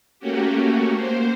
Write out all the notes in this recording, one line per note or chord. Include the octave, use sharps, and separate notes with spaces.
A3 A#3 C#4 F#4 G4
A#3 C5